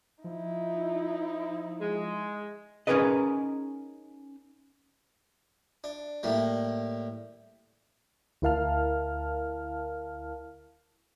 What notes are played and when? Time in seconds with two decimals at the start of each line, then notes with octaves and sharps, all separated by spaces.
0.24 F3 D#4 E4
1.81 G#3
2.87 C#4 D#4 G#4 A#4 B4 D#5
5.84 D4
6.23 A2 G3 A#3
8.42 D2 E4 A#4 F5 A5 F6